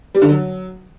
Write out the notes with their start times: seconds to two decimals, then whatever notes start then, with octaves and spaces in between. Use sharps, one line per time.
0.15 G3
0.22 D3
0.29 F#3